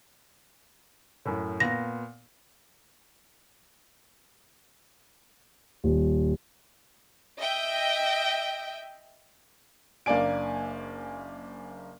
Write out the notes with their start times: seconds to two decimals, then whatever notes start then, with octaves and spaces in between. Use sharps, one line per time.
1.25 F#2 A2
1.60 A#2 B3 A#6
5.84 D#1
7.39 D#5 E5 G5
10.06 F#1 A#3 D4 D5 G#5 D7